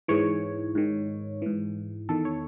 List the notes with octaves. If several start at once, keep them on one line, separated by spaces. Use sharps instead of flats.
G#2 E3 C#5
G#2 D#3
G#2 E3
E2 D#3 A4
C#5